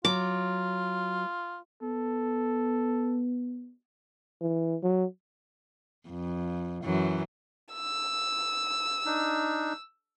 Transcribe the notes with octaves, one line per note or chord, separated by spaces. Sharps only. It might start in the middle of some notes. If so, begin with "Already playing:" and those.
F#3 F4 D6
B3 A4
E3
F#3
F2
F#2 E3 F#3
E6
D4 D#4